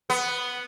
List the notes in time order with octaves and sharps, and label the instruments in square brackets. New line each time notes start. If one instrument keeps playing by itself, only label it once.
[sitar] B3